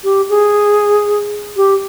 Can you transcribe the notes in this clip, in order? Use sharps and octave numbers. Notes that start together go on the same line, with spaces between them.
G4
G#4
G4